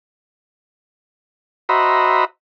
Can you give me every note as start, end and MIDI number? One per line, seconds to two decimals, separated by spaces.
1.69 2.25 66
1.69 2.25 72
1.69 2.25 75
1.69 2.25 76
1.69 2.25 82
1.69 2.25 83